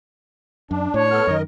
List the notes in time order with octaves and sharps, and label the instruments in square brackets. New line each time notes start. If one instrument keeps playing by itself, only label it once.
[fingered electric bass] F#2 [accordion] D4
[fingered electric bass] A2 [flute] C#5
[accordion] B3 A4 F6
[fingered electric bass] F#2 D#3 [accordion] A#4 D#5